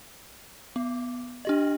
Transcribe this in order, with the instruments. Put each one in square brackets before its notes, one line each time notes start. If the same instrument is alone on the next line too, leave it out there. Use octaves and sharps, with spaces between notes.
[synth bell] B3
D4 G4 D#5